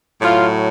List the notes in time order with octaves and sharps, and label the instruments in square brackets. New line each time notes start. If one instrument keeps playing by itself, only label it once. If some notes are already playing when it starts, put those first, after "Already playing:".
[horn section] A2 F#3 F4